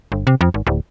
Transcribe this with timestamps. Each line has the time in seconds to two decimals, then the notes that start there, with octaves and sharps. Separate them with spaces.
0.12 G1
0.27 C3
0.41 F2
0.54 G#1
0.67 D1